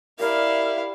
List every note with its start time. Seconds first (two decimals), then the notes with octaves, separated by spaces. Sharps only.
0.20 E4 G4 A#4 D5 F5